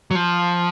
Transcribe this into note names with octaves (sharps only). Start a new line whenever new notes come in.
F#3
F3